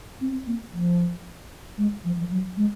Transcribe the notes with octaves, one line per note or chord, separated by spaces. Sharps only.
C4
A#3
F3
G#3
F3
F3
F#3
G#3